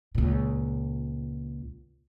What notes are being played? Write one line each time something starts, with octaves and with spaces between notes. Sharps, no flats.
C#2 A#2